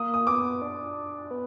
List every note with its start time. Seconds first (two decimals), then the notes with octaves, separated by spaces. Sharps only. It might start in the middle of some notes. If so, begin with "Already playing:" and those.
Already playing: A#3 D#6
0.14 D#6
0.27 B3 D6
0.62 D4
1.31 B3